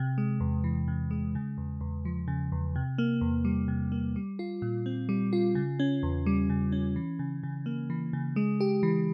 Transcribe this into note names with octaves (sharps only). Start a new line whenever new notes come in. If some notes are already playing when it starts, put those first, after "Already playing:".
Already playing: C3
G#3
E2
E3
C3
G#3
C#3
E2
E2
F3
C#3
E2
C3
A#3
E2
G3
C3
A#3
G3
F4
A#2
C4
G3
F4
C#3
C#4
E2
G3
C#3
C#4
E3
C#3
C#3
A#3
E3
C#3
G#3
G4
E3